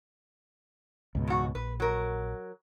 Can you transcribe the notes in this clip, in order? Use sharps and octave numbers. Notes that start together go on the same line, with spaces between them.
C#2 G#2 B2
E2 F#4
A#1 B4
F#3 A#4